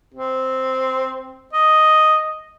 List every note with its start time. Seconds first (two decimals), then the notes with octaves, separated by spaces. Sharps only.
0.14 C4
1.53 D#5